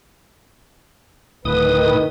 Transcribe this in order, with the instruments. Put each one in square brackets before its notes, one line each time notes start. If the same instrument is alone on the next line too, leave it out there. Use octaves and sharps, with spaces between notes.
[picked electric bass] D1 [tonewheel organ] A2 D#6 [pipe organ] D#3 [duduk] B4